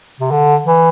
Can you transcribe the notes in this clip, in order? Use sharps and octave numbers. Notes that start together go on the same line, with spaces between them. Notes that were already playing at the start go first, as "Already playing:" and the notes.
C3
D3
E3